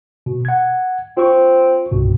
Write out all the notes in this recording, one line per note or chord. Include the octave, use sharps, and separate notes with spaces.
B2
F#5 G#6
C4 F4 C#6
C2 G2 B2